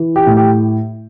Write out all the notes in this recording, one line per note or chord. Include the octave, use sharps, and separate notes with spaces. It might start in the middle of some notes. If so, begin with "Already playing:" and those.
Already playing: E3
G4
A2
G4